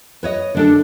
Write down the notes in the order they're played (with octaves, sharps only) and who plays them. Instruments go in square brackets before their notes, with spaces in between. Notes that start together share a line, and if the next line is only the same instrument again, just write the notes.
[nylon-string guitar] B4 C#5 D#5
D3 D4 A4